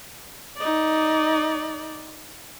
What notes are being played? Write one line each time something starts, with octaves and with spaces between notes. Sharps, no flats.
D#4 D5